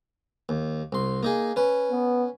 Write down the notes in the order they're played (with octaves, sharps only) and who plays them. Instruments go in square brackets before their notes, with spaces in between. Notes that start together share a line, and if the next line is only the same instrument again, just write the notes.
[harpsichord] D#2
C2 C6
A#3 D#4 G#4
C#4 B4
[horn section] B3